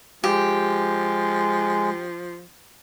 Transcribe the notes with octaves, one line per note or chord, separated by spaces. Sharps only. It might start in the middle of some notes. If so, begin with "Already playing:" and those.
F3 G#3 G4